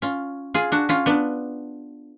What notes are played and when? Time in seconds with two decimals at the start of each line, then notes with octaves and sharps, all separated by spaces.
0.02 C#4 F4
0.54 F4 G#4
0.72 D4 F#4
0.89 C#4 F4
1.06 B3 D4